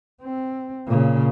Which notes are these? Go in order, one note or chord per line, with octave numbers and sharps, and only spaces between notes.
C4
A#2 C#3